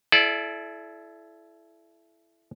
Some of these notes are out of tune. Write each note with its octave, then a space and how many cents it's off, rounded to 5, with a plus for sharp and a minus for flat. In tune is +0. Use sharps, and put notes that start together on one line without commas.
E4 +15 A4 -30 D5 +0